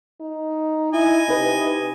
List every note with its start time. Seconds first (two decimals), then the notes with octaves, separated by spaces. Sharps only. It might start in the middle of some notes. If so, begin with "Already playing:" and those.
0.21 D#4
0.93 E4 D#5 G#5
1.29 C3 D#4 B4